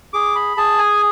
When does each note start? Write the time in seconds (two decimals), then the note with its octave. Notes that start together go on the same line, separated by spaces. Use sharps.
0.13 G#4 D6
0.36 B5
0.57 G#4 A5
0.79 G#5